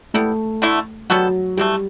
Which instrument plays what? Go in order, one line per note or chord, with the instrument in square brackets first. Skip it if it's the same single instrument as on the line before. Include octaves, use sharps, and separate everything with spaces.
[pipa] G3 B3 E4 [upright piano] A3
[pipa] D3 A3 E4
[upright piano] F#3 [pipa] G3 B3 F#4 A4
[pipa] C3 E3 A3 [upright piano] G3